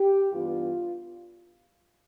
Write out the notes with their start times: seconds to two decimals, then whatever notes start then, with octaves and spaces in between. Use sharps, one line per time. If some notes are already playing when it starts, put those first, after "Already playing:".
Already playing: G4
0.31 G2 E3 G3 B3 D4 F4